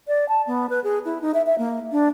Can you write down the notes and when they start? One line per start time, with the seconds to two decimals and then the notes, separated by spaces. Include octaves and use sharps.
0.08 D5
0.29 A5
0.47 B3
0.70 B4
0.84 G#4
1.05 E4
1.22 D#4
1.34 E5
1.46 E5
1.58 A#3
1.92 D4